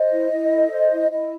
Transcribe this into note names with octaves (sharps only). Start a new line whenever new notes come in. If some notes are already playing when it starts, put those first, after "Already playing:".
Already playing: C5 D#5
E4
E4
A4
C5
E4
E4 D#5